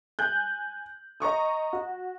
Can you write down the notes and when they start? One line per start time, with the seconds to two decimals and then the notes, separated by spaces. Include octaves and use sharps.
0.19 G#5 F#6 G6
1.20 D#5 A#5 C#6 D#6
1.73 F#4